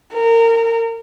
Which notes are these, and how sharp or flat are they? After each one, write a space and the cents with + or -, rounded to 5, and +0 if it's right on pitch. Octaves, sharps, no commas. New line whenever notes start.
A#4 -25